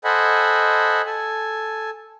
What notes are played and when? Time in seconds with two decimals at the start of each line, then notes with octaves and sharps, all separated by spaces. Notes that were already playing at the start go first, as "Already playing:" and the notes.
0.04 A4 C5 D#5 F#5 G#5 B5
1.06 A4 G#5